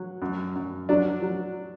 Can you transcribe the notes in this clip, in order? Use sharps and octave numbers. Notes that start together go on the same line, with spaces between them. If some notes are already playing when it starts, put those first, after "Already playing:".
Already playing: F#3
F#2
F#2
F#3 D4
F#3